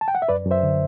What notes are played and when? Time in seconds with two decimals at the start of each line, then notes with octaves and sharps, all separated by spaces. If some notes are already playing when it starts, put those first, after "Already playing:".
0.01 A5
0.08 G5
0.15 F#5
0.22 E5
0.28 F#2 B4 D5
0.45 F#2
0.51 C5 E5
0.63 D3